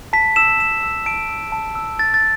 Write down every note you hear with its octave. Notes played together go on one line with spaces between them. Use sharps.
A5 B6
E6 E7
A5 E7
E6
A5 D7
E6
A5
E6
A5 A6
A6